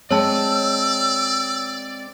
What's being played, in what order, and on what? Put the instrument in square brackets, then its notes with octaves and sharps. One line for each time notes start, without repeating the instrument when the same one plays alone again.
[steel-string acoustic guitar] G#3 C4 [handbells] C#5 A5 [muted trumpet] D5 [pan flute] E6